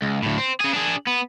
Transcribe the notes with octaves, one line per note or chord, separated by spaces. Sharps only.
C#2
D2 A2
C4
C#3 G#4
D4 G#4
B3